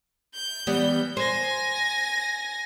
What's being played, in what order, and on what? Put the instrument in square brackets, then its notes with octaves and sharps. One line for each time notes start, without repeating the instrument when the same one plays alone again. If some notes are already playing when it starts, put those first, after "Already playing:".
[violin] G6
[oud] E3 G3 B3
[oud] C5 [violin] G#5 A#6